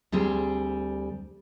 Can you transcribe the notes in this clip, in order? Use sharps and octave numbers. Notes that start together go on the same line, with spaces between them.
D2 G3 C4 G#4